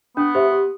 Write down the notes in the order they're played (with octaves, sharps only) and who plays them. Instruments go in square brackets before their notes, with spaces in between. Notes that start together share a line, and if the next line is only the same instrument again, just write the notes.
[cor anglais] B3 [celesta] D4
[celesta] G4 C5 E5
G4